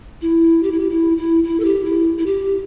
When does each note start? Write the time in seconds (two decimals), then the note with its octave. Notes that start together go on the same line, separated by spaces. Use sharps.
0.22 E4
0.63 G4
0.72 E4
0.80 G4
0.90 E4
1.18 E4
1.44 E4
1.60 A4
1.65 G4
1.85 E4
2.19 E4
2.26 G4